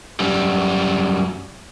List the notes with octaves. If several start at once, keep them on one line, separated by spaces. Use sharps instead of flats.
F#2 G3